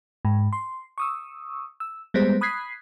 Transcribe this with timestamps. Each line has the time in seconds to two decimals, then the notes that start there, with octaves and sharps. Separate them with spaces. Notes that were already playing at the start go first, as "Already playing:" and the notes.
0.25 G#2
0.53 C6
0.98 C#6 D#6 E6
1.80 E6
2.14 G3 G#3 B3 C5
2.41 B5 D#6 F#6 G#6 B6 C7